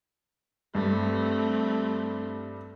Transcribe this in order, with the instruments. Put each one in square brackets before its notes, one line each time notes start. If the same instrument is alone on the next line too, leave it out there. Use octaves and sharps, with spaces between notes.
[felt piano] G2 [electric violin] A3 C4